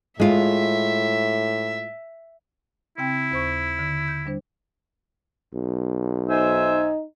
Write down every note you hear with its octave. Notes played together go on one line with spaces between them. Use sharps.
A2 G#3 F4 E5
C#3 C4 E4 G5
D#2 C5 C#6
D3
G6
G3 D4 C5
B1
D#4 C5 E5 G#5